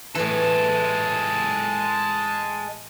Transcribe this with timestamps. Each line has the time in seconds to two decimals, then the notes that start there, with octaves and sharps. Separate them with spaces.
0.15 A2 E3 G#3 A4 A5